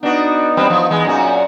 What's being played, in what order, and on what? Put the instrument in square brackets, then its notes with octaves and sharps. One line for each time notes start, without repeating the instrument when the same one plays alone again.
[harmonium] B3 D#4 [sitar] D4 F#4
[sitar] G3 C4 B4
F3
E3 G#3
F#2 A#2 F#4